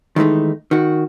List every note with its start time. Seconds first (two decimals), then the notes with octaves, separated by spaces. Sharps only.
0.16 D#3 E3 G#3 A3 D#4
0.71 D#3 F#4